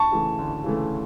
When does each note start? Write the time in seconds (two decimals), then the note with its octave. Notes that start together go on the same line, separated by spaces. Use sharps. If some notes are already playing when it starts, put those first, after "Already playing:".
Already playing: A5 C#6
0.12 C#3 E3 A3
0.39 D2
0.64 C#3 E3 A3